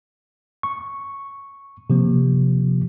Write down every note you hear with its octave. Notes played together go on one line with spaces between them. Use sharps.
C#6
C3 F3 A#3